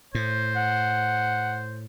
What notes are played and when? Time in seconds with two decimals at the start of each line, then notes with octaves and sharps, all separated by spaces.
0.15 A2 C5
0.56 F#5